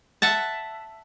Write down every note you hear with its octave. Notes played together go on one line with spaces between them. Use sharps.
E5 F#5 A5